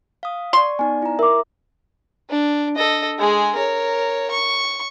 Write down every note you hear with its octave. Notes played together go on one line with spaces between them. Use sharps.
F5 D#6
D5 C6 C#6
B3 D#4 D5 G#5
E4 A#5
A#4 E5 D6
D4
A4 D#5
G#3 G#4
A#4 C#5
C#6